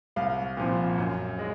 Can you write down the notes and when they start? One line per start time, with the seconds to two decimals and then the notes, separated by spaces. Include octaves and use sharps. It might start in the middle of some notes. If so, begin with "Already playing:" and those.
0.16 C2 F5
0.57 A#2 F3 C4
0.98 F#2
1.39 G#3